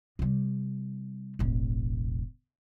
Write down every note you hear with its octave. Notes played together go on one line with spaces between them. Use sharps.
C3 G3
E1 A1